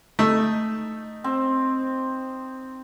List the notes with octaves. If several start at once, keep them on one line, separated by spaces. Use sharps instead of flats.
A3 D#4
C4